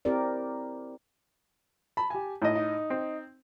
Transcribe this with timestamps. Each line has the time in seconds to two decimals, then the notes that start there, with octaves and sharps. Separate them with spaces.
0.05 C4 E4 G4 A#4 D5
1.97 A5 B5
2.10 G4 G#5
2.42 A2 D#4 D#5
2.55 D#4
2.90 C4